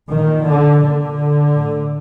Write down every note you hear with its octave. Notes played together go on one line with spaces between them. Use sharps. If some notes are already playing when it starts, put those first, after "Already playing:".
A#2 D#3
D3
A#2 D3
A2